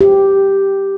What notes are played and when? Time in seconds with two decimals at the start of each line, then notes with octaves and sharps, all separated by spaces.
0.01 G4